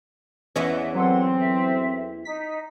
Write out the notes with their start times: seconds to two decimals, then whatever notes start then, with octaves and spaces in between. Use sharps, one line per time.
0.56 E2 E3 C#4 D#5 E5 F#5
0.95 F#3 C4 A4 F#5 C6
1.39 E5
2.25 D#4 B6